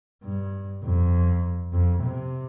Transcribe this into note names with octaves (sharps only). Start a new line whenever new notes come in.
G2
F2
F2
C3